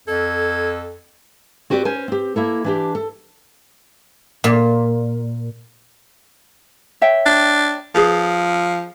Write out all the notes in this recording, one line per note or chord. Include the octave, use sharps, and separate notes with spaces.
F2 A4 G#6
C4 F#4 G4 B4 C5 D5
C#4 B4 C5 G#5
C4 G4
A#3 E4 A4
E3 D4 G4
A4
A#2
C#5 E5 G5
D4
F3 G#4 B4